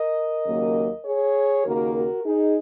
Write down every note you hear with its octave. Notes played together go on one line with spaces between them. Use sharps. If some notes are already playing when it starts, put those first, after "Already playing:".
Already playing: A#4 D#5
D#2 C#3 F#3 A#3
G#4 C#5
D#2 C#3 A#3 F#4 A#4
F#4 A#4
D#4 G#4